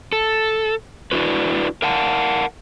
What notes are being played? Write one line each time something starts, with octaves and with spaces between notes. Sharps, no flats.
A4
D4 E4 F#4 B4
A#4 F5 F#5 A5